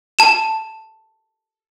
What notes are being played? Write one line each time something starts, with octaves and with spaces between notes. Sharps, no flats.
A5 E7